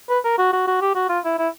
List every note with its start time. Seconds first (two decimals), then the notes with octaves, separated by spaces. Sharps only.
0.09 B4
0.24 A#4
0.38 F#4
0.53 F#4
0.67 F#4
0.81 G4
0.95 F#4
1.09 F4
1.25 E4
1.39 E4